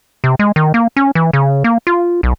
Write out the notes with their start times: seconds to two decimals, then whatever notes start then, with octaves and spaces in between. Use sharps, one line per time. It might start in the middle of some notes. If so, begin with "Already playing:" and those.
0.24 C3
0.39 G#3
0.56 D#3
0.74 A#3
0.97 C#4
1.15 E3
1.33 C#3
1.64 A#3
1.87 F4
2.23 B1